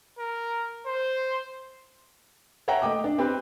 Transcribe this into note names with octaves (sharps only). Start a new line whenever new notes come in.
A#4
C5
C#5 E5 F#5 G5 A#5
A3 D#5 G5 D6
D4
C4 G4 B4